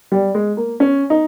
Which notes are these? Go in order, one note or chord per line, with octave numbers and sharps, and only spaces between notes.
G3
G#3
A#3
C#4
D#4